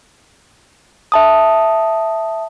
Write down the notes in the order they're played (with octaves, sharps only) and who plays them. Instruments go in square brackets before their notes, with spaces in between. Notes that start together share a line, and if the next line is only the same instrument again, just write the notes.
[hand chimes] E5 A5 D#6